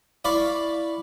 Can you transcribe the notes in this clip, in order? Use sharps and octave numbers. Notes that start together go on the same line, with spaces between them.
E4 D5 F5 B5 C#6